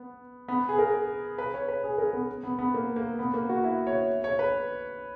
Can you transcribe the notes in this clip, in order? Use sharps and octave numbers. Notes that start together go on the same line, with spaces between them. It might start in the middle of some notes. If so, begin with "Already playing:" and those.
Already playing: B3
B3
G#4
A#4
B4
C#5
B4
G#4
A#4
B3
B3
B3
A#3
A#3
B3
A#3
F#4
E4
C#5
C#5
B4